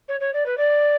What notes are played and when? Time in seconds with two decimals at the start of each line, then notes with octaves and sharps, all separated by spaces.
0.08 C#5
0.20 C#5
0.33 D5
0.46 B4
0.58 D5